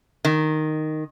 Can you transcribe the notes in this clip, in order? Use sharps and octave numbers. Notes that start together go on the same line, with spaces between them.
D#3